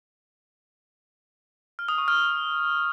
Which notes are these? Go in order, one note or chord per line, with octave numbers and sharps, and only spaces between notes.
F6
D#6
C#6
F6